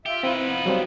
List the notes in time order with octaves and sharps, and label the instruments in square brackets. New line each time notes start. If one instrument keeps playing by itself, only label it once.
[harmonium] F4 E5 [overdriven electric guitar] G4
[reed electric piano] C4 E4 [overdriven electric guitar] D#4 B4
[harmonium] F3 B3
[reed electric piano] F#3 G3 C4